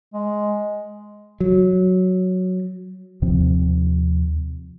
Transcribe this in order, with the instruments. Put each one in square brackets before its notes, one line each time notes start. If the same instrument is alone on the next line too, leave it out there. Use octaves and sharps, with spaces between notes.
[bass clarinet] G#3
[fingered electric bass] F#3
D#2 C3 F3 C4